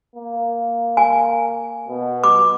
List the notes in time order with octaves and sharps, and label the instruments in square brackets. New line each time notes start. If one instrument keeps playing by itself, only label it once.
[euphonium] A#3
[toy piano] G#5
[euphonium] B2
[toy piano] D6